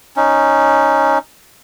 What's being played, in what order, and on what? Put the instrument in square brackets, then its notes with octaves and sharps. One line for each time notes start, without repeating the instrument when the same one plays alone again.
[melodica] C#4 D#4